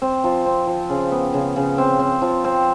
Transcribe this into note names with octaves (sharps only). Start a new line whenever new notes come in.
C4
F3
C4
F3
C#3
B3
C#3
C#3
C4
C4
F3
C4